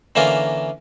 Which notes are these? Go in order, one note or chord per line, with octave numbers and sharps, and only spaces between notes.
D3 E3 A#3 C#4 F4 A#4